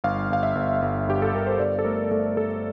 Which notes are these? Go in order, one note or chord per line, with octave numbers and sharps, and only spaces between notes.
G1 F5
G1 F5
E5
G1
G1
G2 G4
A4
G1 A#4
C5
G1 D5
A4
A3 A#4
A3 A4
A3 A4